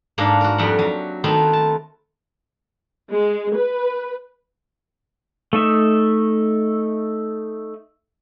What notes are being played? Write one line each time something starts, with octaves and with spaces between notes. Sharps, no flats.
G#2 A#3 D4 F#5 A#5
F#4 A#4
F2 G3 E5 F#5
F#3
D#3 A3 B3 C4
A5
G#3
B4
A3 D#4 E5